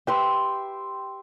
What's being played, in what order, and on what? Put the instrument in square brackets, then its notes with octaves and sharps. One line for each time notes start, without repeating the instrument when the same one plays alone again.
[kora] G4 B4 [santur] E5 G5 C6